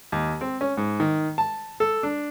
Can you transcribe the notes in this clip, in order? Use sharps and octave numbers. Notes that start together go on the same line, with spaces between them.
D#2
C4
C#4
G#2
D#3
A5
A4
D4